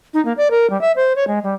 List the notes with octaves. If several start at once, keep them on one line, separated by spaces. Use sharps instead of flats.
D#4
A#3
D5
A#4
G3
E5
C5
C#5
G#3
G3